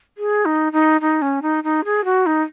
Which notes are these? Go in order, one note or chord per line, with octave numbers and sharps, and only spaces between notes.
G#4
D#4
D#4
D#4
C#4
D#4
D#4
G#4
F#4
D#4